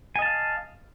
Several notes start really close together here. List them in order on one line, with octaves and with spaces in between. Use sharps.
G#5 D#5 A5 F5